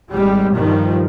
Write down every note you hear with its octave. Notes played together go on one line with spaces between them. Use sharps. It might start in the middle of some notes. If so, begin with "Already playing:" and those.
G#1 G3 G#3
G2 D#3 F3